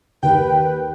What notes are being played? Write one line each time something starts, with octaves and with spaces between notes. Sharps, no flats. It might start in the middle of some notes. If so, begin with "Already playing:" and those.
D#2 B4 G5